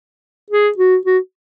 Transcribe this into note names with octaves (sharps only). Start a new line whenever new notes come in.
G#4
F#4
F#4